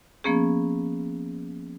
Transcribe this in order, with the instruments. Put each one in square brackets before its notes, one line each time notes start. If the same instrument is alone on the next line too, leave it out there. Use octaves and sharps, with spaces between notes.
[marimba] F3 A#3 B3 C#4 G#4